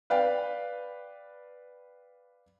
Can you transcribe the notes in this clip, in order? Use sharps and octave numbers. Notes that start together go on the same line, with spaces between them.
B4 D5 F5 G5